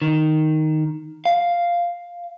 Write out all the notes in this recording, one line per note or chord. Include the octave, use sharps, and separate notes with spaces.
D#3
F5